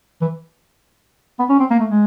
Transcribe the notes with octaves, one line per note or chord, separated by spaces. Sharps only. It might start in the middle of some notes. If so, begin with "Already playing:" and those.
E3
B3
C#4
C4
A#3
A3
G#3